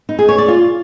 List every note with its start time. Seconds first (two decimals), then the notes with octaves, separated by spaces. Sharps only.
0.09 D#4
0.19 G#4
0.29 C#5
0.38 D5
0.48 F4